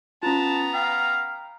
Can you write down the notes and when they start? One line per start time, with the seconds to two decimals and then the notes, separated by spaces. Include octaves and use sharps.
0.23 B3 C#4 F4 A5 A#5
0.74 F5 G5